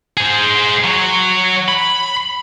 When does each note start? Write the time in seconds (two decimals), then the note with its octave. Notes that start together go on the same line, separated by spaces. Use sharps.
0.17 G#4 C5
0.84 F#3 C#5
1.68 B5